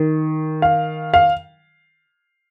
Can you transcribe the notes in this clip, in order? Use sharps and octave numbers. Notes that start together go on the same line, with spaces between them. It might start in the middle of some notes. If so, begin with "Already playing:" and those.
Already playing: D#3
F5
F5